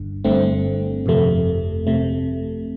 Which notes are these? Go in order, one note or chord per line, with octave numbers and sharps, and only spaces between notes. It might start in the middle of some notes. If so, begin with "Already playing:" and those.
Already playing: G1 G2 D3
G1 G2 D3 A3 C4
G1 F2 C3 A3
C3 A3